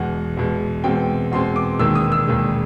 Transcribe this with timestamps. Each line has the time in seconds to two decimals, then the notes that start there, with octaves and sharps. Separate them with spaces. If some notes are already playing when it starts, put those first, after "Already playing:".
Already playing: E2 B2 G#3 F#5
0.37 E2 B2 G#3
0.84 E2 B2 G#3 C4 G5
1.31 E2 B2 G#3 C4 C6
1.56 D6
1.79 E1 D#2 D#3 G#3 E6
1.95 D#6
2.12 E6
2.27 E1 D#2 D#3 G#3